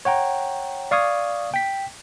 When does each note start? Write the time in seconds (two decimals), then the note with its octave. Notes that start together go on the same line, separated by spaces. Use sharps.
0.05 C#5 F#5 G5 A#5
0.91 D5 F5 C#6 D#6 G#6
1.54 G5 B6